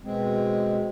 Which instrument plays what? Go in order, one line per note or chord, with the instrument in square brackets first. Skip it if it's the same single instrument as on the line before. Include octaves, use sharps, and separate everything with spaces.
[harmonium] B2 G#3 C4